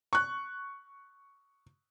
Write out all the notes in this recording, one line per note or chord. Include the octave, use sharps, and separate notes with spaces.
C#6 F#6